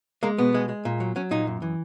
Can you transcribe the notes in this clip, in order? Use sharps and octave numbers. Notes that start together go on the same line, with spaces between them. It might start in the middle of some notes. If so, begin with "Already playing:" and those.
G#3 A#3
B2 B3
G#3
G#3
A#2
F#3
F#3 C#4
A#2 D#4
F#2
E3